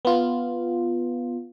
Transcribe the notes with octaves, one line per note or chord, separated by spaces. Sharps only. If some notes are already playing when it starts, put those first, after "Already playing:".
B3 F4